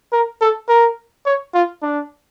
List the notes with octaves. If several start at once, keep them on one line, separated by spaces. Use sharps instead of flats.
A#4
A4
A#4
C#5
F4
D4